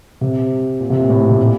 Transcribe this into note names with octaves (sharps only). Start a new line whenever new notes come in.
C3
A#2
C3
A#2
A2
A#2
C3
A#2